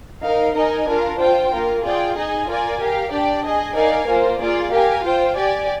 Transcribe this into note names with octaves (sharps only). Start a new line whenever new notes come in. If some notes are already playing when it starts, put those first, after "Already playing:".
D#4 A#4 F5
D#4 A#4 D#5 G#5
D4 F4 A#4
F4 C5 G5
A#3 F4 A#4
F4 G#4 D5 G5
D#4 G#4 D#5 G#5
F4 A#4 D5 G#5
G4 A#4 F5
D4 G4 D5 G5
G#4 D#5 G#5
D#4 A#4 D5 F5 G#5
A#3 F4 C5
A#3 F4 G#4 D5
G4 A#4 F5 G#5
F4 C5 G5
G4 D5 G#5